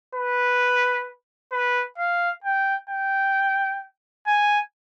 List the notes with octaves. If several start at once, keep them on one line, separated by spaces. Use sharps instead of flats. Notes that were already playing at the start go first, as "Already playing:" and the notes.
B4
B4
F5
G5
G5
G#5